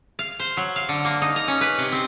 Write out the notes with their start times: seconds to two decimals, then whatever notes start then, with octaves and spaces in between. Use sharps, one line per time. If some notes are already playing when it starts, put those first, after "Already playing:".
0.19 F5
0.39 C5
0.57 F#3
0.76 F5
0.89 D3
1.05 A#3
1.22 D#4
1.36 A#5
1.48 C#4
1.61 B4
1.78 C3
1.92 C4